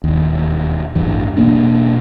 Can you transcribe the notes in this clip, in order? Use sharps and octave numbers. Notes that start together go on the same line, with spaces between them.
E1 D#2
A1 E2 G2 E3
E1 B2 A#3 D4